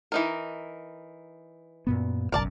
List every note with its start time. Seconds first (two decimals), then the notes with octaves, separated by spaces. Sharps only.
0.12 E3 D#4 A#4
1.87 F#2 A#2 B3
2.32 F#1 B1 F#2 A#4 D5 A5